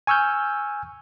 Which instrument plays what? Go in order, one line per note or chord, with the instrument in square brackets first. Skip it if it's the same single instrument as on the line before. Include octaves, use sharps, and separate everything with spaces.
[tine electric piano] G#5 C#6 E6 F6 G6